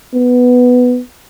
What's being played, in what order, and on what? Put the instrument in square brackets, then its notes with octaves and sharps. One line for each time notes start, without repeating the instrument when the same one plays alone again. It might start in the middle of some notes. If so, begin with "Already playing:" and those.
[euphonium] B3